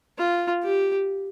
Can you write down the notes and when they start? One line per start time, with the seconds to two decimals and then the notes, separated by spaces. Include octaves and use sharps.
0.18 F4
0.63 G4